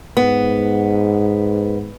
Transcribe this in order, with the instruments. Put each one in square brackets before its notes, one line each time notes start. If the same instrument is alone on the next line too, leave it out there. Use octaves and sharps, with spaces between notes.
[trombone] G#2 [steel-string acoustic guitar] B3